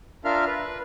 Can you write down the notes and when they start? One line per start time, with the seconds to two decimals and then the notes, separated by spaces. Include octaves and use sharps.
0.25 D4 F4 A#4 E5 F5 F6
0.47 B4